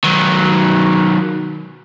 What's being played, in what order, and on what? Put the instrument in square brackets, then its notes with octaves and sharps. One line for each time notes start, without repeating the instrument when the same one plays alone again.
[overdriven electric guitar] D#3 F#3